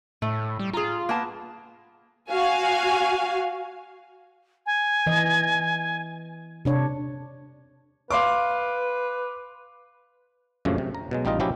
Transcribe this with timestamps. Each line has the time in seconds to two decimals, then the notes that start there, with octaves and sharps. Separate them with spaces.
0.22 A2 A3
0.59 G3
0.73 F4 G#4 A#5
1.09 A#3 B3 A5
2.32 F#4 F5 G#5
4.66 G#5
5.07 E3 D#5
6.65 C3 D4 C#5
8.11 B4 F5 C6 D6
10.65 F#2 A#2 C#3 F3 A3 D4
10.78 C3
10.95 A#5
11.11 B2 F#3 G#3
11.25 A1 G3 D#4 F4 D#5
11.40 F3 F#3 C#4 E4 G4 D#5